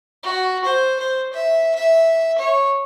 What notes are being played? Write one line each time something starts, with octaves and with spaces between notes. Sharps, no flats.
F#4
C5
C5
E5
E5
C#5